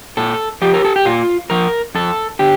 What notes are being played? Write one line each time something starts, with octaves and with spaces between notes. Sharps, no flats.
A#2 A4
F3 G4
A#4
A4
G4
A#2 F4
F3 A#4
F2 A4
D3 G4